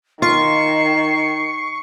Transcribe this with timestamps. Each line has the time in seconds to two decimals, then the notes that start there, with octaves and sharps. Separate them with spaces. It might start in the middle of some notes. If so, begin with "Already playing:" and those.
0.22 D#3 F4 C#6 C7